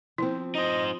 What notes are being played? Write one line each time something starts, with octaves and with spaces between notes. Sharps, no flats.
F3 C4 E4
D#4 C5 D#5